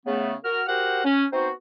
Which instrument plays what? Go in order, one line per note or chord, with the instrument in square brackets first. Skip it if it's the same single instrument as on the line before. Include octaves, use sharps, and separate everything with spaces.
[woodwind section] C#3 A3 B3
F#4 A#4 F6
F#4 G4 A#4 C5 F#5
C#4
B3 C4 D#4 F#4 C5